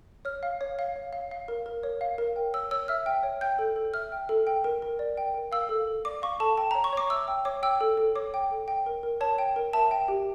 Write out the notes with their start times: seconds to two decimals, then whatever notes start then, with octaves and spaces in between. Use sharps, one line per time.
0.25 C#5 F6
0.43 F5
0.61 C#5
0.79 F5
0.96 C#5
1.13 F5
1.31 F5
1.48 A#4
1.66 A#4
1.83 C#5
2.01 F5
2.18 A#4
2.36 G5
2.53 C#5 E6
2.71 C#5 E6
2.88 E5 F6
3.06 G5
3.23 C#5
3.41 G5 G6
3.59 A4
3.76 A4
3.94 E5 F6
4.12 G5
4.29 A4
4.47 G5
4.64 A#4
4.82 A#4
4.99 D5
5.17 G5
5.34 A#4
5.52 F5 E6
5.69 A4
5.87 A4
6.05 D5 D6
6.22 F5 C#6
6.40 A4 A5
6.58 G5 A5
6.71 C#5 A#5
6.84 C#6
6.93 C#5 D6
7.10 E5 E6
7.28 G5
7.45 C#5 D6
7.63 G5 E6
7.81 A4
7.97 A4
8.15 C#5 D6
8.34 G5
8.51 A4
8.68 G5
8.86 A#4
9.03 A#4
9.21 C#5 A5
9.38 G5
9.56 A#4
9.73 E5 A5
9.91 G5
10.08 G4